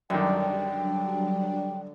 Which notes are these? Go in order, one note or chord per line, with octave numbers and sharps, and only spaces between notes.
F#2 D3 D#3 F#3 G3 D4 D5 G5